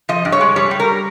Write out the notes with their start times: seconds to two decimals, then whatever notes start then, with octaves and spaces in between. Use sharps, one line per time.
0.09 F3 D#5
0.25 G2
0.32 C#5
0.41 G#3
0.56 G3 C#5
0.71 G3
0.80 A#4